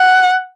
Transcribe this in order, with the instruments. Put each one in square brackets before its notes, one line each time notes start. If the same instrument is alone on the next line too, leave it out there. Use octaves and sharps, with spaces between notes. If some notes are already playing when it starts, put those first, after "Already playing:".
Already playing: [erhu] F#5